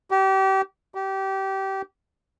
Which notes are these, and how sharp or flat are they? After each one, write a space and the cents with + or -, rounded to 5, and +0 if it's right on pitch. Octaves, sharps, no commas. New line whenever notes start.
G4 -30
G4 -25